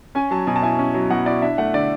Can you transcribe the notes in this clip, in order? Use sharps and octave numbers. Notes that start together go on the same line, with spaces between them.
C#4 G#5
F#3 A5
B2 G#5
A5
E4 G#5
C#4
F#3
B2 F#5
E4 D5
D4 E5
A3 F#5
D3 D5